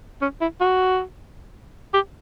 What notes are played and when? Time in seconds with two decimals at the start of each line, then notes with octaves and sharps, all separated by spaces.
0.22 C#4
0.41 E4
0.61 F#4
1.94 G4